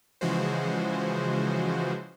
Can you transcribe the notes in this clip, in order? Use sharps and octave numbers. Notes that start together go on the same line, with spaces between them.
C#3 E3 F3 G#3 F#4 C5